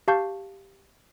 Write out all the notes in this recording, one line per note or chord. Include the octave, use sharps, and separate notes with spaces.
G4 F5 A5 C#6 G6